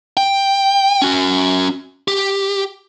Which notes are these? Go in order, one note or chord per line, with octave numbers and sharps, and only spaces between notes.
G5
C#4 F#4
G4